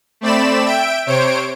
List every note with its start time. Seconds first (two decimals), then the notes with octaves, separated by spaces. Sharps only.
0.21 A3 C4 D5 B5 E7
0.65 E5 G5 D7
1.06 C3 C5 C#5 D7